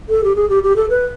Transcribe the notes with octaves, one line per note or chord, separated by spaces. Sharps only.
A4
G4
G#4
G4
G4
A4
B4